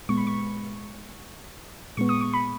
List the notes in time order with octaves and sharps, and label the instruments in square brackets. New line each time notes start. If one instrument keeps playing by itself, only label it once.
[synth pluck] A#2 G#3 B3 C#6
B5
C#6
A#2 G#3 B3 C#6
D#6
C#6
B5